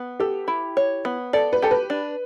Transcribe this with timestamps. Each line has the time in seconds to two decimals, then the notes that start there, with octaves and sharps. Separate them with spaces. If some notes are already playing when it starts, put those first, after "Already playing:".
Already playing: B3
0.20 G4 A4
0.48 E4
0.77 C#5
1.05 B3
1.33 A4 D5
1.53 B4
1.62 G4 A4
1.71 B4
1.90 D4